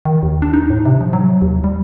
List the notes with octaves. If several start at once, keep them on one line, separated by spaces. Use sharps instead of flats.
D#3
D#2
D4
D#4
A2
C3
F3
F#3
D#2
G3